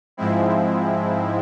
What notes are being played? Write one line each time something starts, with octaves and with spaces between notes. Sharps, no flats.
G#2 F3 G#3 C4 E4